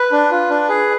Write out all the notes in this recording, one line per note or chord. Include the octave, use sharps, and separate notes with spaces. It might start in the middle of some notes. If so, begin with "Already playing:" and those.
Already playing: B4
D4
F4
D4
G#4